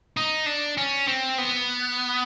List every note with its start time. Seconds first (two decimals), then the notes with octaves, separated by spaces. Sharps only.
0.17 D#4
0.46 D4
0.78 C#4
1.07 C4
1.38 B3